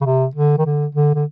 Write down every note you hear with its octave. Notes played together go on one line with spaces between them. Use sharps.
C#3
C3
D3
D#3
D3
D3
D3